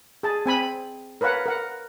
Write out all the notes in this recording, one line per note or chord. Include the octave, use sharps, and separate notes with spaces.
G#4 A5
C4 G#5 B5
A#4 B4 C#5 F5 F#5
A#4 F#5